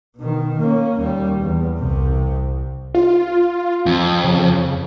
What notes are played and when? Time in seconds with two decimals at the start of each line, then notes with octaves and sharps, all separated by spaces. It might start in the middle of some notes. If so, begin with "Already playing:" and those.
0.17 B2 D#3
0.60 A#3 C#4
1.00 D#2 G3
1.39 E2
1.79 C2 C3
2.94 F4
3.86 F2
4.24 C#3